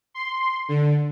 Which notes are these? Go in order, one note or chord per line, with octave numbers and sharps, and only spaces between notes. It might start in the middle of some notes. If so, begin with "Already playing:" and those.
C6
D3